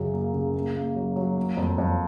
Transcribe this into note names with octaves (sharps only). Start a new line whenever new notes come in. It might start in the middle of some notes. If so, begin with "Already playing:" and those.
Already playing: F#2 C#3 F#3
A#3
C#3
A#3
A#3
F#3
F#3
A#3
F2
F2